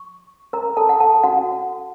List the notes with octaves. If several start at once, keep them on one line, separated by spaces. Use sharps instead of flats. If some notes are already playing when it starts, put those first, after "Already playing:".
Already playing: C#6
A#4 A#5
A4 A5
F#5
A4 A5
F#4 F#5